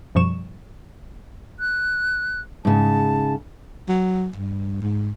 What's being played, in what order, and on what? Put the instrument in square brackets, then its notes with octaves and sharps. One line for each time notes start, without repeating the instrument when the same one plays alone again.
[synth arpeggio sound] F#2 B2 F3 G3 C#6 E7
[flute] F#6
[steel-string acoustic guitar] G#2 C#3 [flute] A5
[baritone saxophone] F#3
G2
G#2